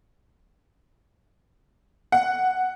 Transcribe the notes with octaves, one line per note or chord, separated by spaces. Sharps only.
F#5